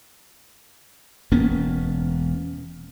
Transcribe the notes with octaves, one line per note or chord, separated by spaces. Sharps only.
E1 A#3 B3 C#4